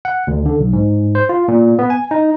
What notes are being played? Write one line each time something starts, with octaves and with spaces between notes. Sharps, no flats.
F#5
D2
D3
B1
G#2
C5
F4
A#2
B3
G#5
D#4